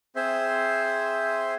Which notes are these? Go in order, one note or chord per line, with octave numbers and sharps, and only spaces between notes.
C4 G#4 C5 E5 C6